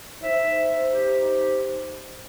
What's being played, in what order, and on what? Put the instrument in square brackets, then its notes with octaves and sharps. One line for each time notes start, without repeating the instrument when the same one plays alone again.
[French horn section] D#4 C5 [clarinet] E5
[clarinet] G4